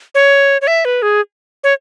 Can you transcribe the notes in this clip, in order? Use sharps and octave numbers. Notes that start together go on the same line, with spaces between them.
C#5
C#5
E5
B4
G#4
C#5